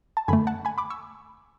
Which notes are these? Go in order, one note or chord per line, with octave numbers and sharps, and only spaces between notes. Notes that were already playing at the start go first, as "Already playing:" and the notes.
A5
F#2 D3 A3 G#5 B5
F#5 A5
G#5 B5
B5 D6
C#6 E6